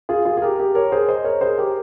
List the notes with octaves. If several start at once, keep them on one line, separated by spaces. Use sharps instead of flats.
F4 G#4
F4 G#4
G#4
G4 A#4
G4 A#4
A#4 C#5
G#4 C5
C5 D#5
A#4 C#5
G#4 C5
G4 A#4